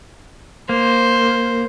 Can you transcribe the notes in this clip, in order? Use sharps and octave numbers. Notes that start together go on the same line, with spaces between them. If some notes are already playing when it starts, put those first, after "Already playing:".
A#3 C5